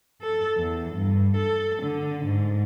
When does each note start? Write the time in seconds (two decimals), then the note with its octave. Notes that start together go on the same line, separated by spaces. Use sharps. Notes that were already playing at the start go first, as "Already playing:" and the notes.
0.22 A4
0.57 E2
0.94 G2
1.36 A4
1.82 D3
2.25 G#2